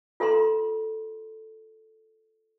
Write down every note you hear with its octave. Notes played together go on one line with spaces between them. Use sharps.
F4 A4 A#5 C6